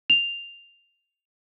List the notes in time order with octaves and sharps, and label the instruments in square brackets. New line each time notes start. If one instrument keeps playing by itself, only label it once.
[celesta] F7